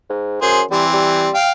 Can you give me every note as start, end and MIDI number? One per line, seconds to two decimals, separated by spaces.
0.10 0.41 44
0.42 0.63 42
0.42 0.61 68
0.42 0.61 72
0.71 1.29 52
0.71 0.85 55
0.71 1.29 60
0.93 1.34 55
1.34 1.52 77
1.34 1.52 79